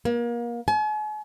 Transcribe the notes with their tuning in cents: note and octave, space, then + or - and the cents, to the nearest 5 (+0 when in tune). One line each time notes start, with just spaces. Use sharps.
A#3 +30
G#5 +45